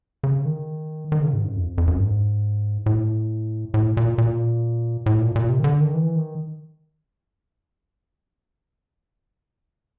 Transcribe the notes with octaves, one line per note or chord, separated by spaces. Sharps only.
C#3
D#3
D#3
C#3
G#2
F#2
F2
F2
F#2
G#2
A2
A2
A#2
A#2
A2
A#2
A#2
C3
D#3
D3
D#3
E3
D#3